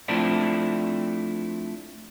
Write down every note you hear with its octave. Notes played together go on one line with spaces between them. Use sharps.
F3 A3 C4 D4 E4